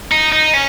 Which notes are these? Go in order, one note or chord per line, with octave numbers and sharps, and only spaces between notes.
D#4
D#4
C#4